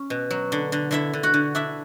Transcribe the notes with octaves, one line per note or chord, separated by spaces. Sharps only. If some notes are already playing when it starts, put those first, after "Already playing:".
Already playing: C#4
B2
F#3
D3
D3
D3 E4 E5
D3
F#4 F#5
D3
D4 E4 E5